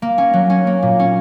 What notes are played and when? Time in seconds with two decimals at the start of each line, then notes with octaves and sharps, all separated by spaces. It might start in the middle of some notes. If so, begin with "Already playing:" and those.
0.02 A#3
0.18 C#4
0.33 F#3
0.50 C#4
0.67 A#3
0.82 A#2
0.99 C#4